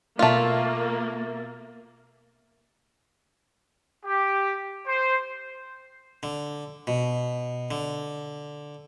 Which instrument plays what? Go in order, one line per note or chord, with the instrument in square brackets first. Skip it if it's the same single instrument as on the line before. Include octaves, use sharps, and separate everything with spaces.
[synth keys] B2 E5 A6 [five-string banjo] A3 F4 [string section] A#3
[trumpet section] G4
C5
[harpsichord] D3
B2
D3